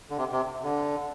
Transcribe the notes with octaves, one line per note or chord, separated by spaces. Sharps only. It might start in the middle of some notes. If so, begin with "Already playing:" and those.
D3
C3
C3
D3